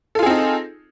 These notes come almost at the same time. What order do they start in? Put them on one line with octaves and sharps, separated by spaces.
A4 F4 G#4 C4 D#4